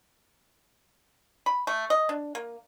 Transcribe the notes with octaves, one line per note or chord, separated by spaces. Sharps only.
B5
A3
D#5
D4
A#3